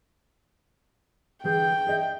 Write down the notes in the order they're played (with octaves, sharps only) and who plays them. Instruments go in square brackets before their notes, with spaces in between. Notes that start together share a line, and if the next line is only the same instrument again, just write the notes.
[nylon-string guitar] D3 E3 G#4 [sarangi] G5 [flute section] G6
[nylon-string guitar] G#4 D#5 E5